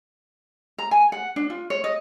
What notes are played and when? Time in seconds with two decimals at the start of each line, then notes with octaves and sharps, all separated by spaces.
0.78 A#5
0.91 G#5
1.12 F#5
1.36 D4
1.50 F4
1.70 C#5
1.84 D#5